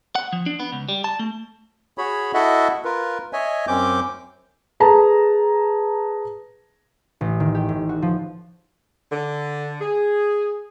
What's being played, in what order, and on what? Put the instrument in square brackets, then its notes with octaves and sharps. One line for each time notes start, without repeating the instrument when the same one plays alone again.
[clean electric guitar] F#5
F3
D4
B3
C#2
G3
A5
A3
[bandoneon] F#4 G#4 C#5 B5
E4 F#4 A4 D#5 E5 F#5
F4 A#4 B4
C#5 D#5 E5 G#5
F#2 C4 C#4 D6 G6
[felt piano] G#4 A4 B4 A5 A#5
[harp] A1
D#3
G4
A2
F#4
F3
[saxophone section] D3
G#4